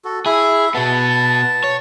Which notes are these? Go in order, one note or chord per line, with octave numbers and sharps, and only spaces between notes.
F#4 A4
E4 G#4 E5
B2 B3 A5
C#5